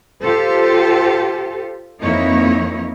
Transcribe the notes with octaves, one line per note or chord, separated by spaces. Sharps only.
F4 G4 A4 C5
F2 E3 A#3 D#4 E4 C#5